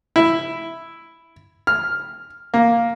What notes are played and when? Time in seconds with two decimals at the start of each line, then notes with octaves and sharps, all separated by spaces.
0.16 E4
1.67 F6
2.54 A#3